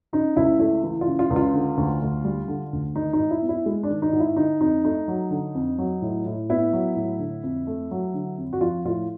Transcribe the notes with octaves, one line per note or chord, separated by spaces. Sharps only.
C#3 D#4
C#2 E4
A3 E4
E3
F4
C#3
F4
C#2
F4
D3
D2
D2
G3
D3
D2
D#3 D#4
D#4
G#2
E4
B3
E4
G#3
D4
D#3
D#4
G#2
E4
D3 D#4
F2 D#4
A3 D#4
F#3
D3
F2
F#3
A2
A2
B3 E4
F#3
A2
D3
F2
A3
F#3
D3
F2
F#4
F3 F4
A2 F4